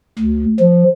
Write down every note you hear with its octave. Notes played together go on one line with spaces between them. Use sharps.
D2
F3